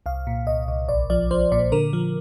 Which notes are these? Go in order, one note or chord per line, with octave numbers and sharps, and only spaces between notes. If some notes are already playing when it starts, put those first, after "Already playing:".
C2 F5
A#2
C2 D#5
C2
A#1 D5
F3 D5
F3 C5
A#2 D5
D3 A#4
F3